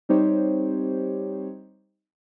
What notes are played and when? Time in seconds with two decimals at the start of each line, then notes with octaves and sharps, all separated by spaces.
0.09 G3 C4 D#4 G4 C5 C#5